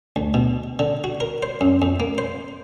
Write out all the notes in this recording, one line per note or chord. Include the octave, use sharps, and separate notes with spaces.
D2
B2
D3
F#4
A#4
C5
F#2
F2
A#3
C5